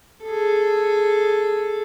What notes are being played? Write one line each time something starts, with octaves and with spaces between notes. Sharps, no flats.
G#4 A4